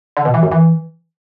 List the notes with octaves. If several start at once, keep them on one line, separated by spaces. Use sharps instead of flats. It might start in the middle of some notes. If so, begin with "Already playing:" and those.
D3
B2
E3
F#2
E3